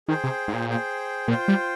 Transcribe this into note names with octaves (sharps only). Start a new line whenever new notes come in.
D#3 G#4 C5 G5
C3
G#2
A#2
G#4 C5 G5
A#2 F4 C5 G5
G3